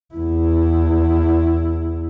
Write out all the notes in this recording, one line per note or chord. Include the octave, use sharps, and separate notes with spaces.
E2 E4